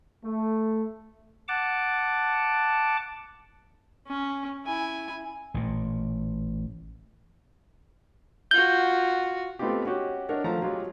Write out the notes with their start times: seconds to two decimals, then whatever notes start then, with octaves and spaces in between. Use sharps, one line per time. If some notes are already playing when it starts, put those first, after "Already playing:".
0.24 A3
1.48 F#5 A5 D6
4.07 C#4
4.66 E4 G#5
5.54 A1 A#2
8.51 F4 F#4 G6
9.59 A3 B3 C4 D#4 F4 G4
9.85 C#4 D#4 F#4 G4 F#5
10.29 D4 D#4 A#4 C#5 F#5
10.44 F3 A3 A#5
10.62 F#3 G#3 F4 G4